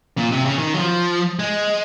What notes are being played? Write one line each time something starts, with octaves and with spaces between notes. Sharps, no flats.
A#2
C3
C#3
D#3
F#3
F3
G#3